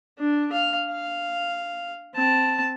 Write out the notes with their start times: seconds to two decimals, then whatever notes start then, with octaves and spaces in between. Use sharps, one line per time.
0.18 D4
0.52 F5
0.90 F5
2.15 C4 A5